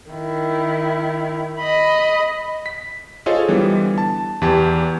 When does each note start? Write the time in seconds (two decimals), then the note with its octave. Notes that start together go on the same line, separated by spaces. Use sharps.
0.11 D#3 E4
1.60 D#5 B5
2.66 B6
3.26 F4 G#4 A4 C5 C#5 D#5
3.48 D3 E3 G3 B3
3.98 A5
4.42 E2 E3 G4 A5